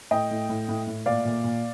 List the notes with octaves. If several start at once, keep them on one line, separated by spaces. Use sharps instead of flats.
A2 D#5 G5
A2
A2
A2
A2
A#2 D5 F5
A#2
A#2